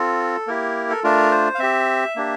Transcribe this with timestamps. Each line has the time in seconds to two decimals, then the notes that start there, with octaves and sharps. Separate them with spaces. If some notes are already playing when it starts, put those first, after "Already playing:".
Already playing: C4 F4 A4
0.47 A#3 E4 G4 A#4
0.90 A4
1.04 A3 D4 F4 A#4
1.31 C5
1.55 F5
1.59 C4 G4 E5
2.16 A#3 D4 G4